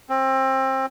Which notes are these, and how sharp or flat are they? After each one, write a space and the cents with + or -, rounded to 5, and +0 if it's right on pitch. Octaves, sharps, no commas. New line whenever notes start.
C4 +25